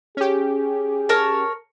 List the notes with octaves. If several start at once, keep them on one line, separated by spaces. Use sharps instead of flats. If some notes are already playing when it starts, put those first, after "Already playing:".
C#4 G4 G#4
A#4 C#5 A5